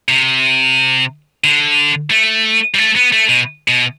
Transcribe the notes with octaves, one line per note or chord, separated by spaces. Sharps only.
C3
D3
A3
G3
A3
B3
A3
B2
B2